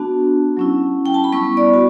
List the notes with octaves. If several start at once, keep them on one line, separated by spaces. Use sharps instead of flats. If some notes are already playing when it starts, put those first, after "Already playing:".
Already playing: B3 D4 F#4 A5
F#3 C#4 E4
G5
A5
B5
G3 B3 E4 C#6
D5
F#4